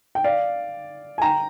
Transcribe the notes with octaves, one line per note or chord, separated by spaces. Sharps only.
G5
D5 F5
G#5
G5 A#5